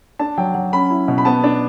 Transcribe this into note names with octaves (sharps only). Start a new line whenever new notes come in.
D4 A5
F#3 G5
F#3
C#4 B5
E4
B2
B5
B3 A5
D4